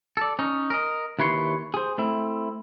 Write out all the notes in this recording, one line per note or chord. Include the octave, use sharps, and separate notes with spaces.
A4 D5
C#4 D#4
A#4 D#5
D#2 E4 B4 C#5 C6
G#4 C5
A3 C4 E4